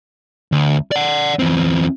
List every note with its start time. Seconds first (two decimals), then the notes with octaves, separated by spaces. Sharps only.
0.52 D2
0.91 D5 F#5
1.39 E2 C4